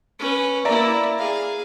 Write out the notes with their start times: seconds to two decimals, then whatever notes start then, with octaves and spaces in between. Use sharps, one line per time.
0.19 C#4 B4
0.65 A#3 E4 D5 E5 A#5
1.18 G#4 F5